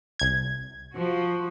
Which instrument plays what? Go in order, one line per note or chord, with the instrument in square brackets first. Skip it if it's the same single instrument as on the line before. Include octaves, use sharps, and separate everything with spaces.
[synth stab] C2 G#6
[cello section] F3 F#4